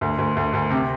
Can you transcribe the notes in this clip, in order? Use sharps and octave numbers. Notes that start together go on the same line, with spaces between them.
D2
D2
D2
D2
C3